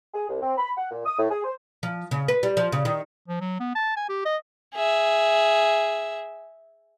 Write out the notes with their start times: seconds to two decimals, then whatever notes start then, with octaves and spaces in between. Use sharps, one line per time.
0.14 G#4
0.28 C2
0.41 C4
0.57 B5
0.77 F#5
0.91 A#2
1.05 D#6
1.18 A2
1.30 G#4
1.44 C5
1.83 F3
2.11 C#3
2.28 B4
2.43 G3
2.57 F3
2.72 C#3
2.85 D#3
3.29 F3
3.41 F#3
3.60 B3
3.75 A5
3.97 G#5
4.09 G4
4.26 D#5
4.75 G#4 E5